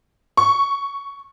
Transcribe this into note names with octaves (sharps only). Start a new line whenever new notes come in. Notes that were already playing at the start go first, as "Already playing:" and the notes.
C#6